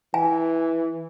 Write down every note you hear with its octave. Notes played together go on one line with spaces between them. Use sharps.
E3 G#5